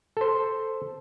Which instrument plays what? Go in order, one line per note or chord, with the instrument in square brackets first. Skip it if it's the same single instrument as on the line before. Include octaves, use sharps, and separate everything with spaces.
[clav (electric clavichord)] A4 C5